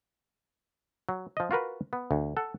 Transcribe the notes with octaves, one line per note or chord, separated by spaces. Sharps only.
F#3
F3 D#5
F4 F#4 A#4 B4
B3
D2
A4 F#5